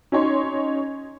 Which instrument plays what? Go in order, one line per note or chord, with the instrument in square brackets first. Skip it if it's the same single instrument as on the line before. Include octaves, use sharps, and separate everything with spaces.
[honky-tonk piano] C#4 D#4 C#5 C6